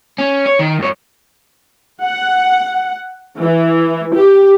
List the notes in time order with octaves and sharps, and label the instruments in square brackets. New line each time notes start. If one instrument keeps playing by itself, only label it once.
[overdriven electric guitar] C#4
C#5
D#3
G2 C#5
[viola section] F#5
E3
G4